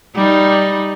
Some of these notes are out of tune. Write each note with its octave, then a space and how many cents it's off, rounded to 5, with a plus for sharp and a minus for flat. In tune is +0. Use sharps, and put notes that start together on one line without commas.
G3 +0 D#4 +0